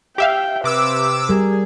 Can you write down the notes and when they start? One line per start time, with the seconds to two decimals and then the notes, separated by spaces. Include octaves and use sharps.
0.18 G4 E5 F5 G5
0.64 C3 B4 D6 E6
1.29 G3 G#4 A#4